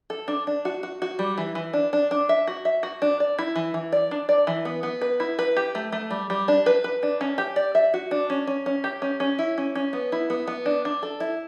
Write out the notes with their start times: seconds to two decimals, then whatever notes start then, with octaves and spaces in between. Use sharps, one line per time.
0.10 A4
0.28 D4
0.47 D4
0.65 F#4
0.83 F#4
1.02 F#4
1.19 G3
1.38 E3
1.55 E3
1.73 D4
1.93 D4
2.11 D4
2.29 E5
2.47 F#4
2.65 E5
2.83 F#4
3.02 D4
3.20 D5
3.38 E4
3.56 E3
3.74 E3
3.92 D5
4.11 D4
4.29 D5
4.47 E3
4.65 B3
4.83 B3
5.01 B4
5.20 E4
5.39 B4
5.56 G4
5.75 A3
5.92 A3
6.11 G3
6.30 G3
6.48 D4
6.66 B4
6.84 B4
7.03 D4
7.21 C#4
7.38 G4
7.56 D5
7.75 E5
7.94 F#4
8.11 D4
8.30 C#4
8.47 C#4
8.66 C#4
8.84 G4
9.02 C#4
9.20 C#4
9.39 E4
9.58 C#4
9.75 C#4
9.93 B3
10.12 E4
10.30 B3
10.47 B3
10.66 D4
10.85 D4
11.03 A4
11.20 E4